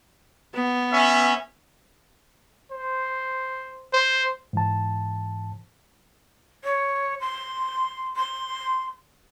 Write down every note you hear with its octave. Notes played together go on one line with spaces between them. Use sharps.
B3
C#4 E5
C5
C5
G#2 E3 A5
C#5
C6
C6